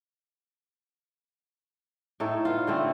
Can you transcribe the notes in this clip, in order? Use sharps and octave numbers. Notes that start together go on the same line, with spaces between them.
A2 D#4 A4 C#5
B3 F4
D3 A3 C4